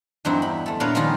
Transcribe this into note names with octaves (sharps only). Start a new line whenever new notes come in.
E2 G2 F#3 C4 D#4 E4
B5
A3 A4
A#2 B3 D4 A#4 C#5 F5
D#3 F3 G3 C#4 D#4 F4